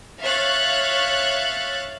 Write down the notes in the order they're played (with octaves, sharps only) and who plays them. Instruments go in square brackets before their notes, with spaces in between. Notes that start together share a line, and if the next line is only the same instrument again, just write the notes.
[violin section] C#5 E5 F5 C#6 F#6 A6